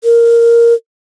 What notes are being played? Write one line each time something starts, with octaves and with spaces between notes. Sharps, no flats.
A#4